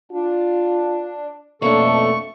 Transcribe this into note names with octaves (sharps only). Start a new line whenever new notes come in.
D4 F4
F2 B2 A3 A#3 C#4 D4 A4 C#6